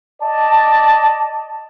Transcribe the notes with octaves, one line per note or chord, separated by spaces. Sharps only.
D5 D#5 A5